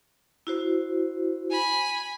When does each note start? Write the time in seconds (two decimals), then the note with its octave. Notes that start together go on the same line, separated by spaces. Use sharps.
0.47 E4 F#4 C5
1.51 G#5 B5